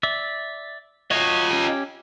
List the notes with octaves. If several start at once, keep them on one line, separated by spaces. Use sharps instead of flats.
D5 E5
F4 F#4 C#5 D#5
C#4 G4